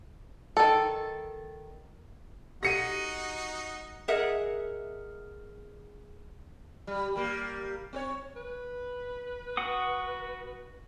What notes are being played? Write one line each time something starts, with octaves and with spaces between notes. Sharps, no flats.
D#3 A4
D#4 F#4 G4 A4 F#5 A#6 C#7 D#7
G#4 A#4 D#5 E5 F#5
G3
G3 A#3
C4 B4 C#5
B4
F#4 F#5 D#6